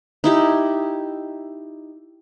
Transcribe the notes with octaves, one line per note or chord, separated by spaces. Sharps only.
D#4 E4 G4